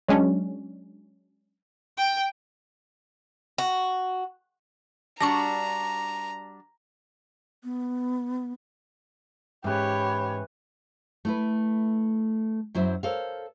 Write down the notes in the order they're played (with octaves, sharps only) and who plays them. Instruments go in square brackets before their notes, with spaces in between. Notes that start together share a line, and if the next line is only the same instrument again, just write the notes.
[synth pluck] F#3 G#3 C#4 D4
[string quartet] G5
[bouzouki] F#4
[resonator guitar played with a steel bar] G3 D4 F#4 [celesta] A5 [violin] A#5 [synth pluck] C#6 D6 A#6
[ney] B3
[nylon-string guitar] G#2 C#4 [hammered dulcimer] E3 B4 [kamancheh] G4 C#5
[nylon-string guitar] A3 E4 B4
F#2 F#3 E4 C5 E5
A4 A#4 C5 C#5 F5